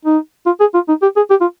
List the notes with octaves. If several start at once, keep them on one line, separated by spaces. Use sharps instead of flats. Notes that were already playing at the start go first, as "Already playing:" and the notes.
D#4
F4
G#4
F4
D#4
G4
G#4
G4
F4